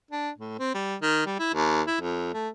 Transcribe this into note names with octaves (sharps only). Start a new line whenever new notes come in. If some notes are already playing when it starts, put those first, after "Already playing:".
D4
A2
C4
G3
D#3
G3
E4
D#2
E4
F2
A3